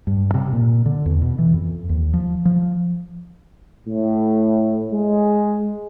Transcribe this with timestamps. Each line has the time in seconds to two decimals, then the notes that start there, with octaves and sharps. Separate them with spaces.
0.07 G2
0.34 C3
0.53 A#2
0.86 D3
1.06 E2
1.22 B2
1.39 E3
1.54 F2
1.89 D#2
2.14 F3
2.45 F3
3.87 A2
4.91 G#3